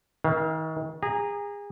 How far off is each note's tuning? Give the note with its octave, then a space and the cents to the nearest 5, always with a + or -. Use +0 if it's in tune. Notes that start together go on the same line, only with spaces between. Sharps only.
D#3 +40 F5 +0
G#4 -30 A#5 +0